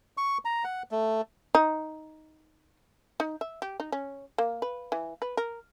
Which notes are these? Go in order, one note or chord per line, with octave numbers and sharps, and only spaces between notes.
C#6
A#5
F#5
A3
D#4
D#4
E5
G4
D#4
C#4
A#3
B4
E3
B4
A#4